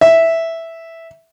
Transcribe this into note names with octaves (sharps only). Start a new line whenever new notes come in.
E5